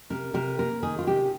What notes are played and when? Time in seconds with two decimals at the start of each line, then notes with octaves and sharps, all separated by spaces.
0.10 C3 A#4
0.34 C3 A#4
0.58 A#3 A#4
0.83 D#3 G#4
0.99 F4
1.07 C3 G4